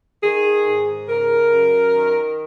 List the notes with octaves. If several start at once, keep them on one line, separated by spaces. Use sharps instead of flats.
D#3 G#4
G#2
C#3 A#4
F#2
D#3